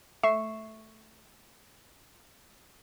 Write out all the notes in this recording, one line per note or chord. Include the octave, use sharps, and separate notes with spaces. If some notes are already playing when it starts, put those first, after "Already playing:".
A3 E5 C#6 C7 E7